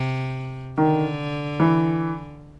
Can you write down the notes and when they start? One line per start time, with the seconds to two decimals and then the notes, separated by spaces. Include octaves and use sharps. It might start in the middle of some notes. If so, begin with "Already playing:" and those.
Already playing: C3
0.78 D3 D#3
1.60 E3